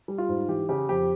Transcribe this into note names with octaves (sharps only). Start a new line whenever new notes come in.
G3
F4
G#2
E3 G4
C#3 G4
F2 G4